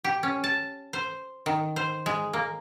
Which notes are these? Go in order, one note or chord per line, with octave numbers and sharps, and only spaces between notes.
G4
C#4
A5
C5
D#3
C5
G#3
A#3